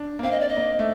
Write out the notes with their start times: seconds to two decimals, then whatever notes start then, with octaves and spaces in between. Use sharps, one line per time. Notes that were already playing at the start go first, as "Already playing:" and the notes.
Already playing: D4
0.19 A#3
0.23 C4 F5
0.31 D#5
0.40 D5
0.49 D#5
0.57 A#3
0.79 A3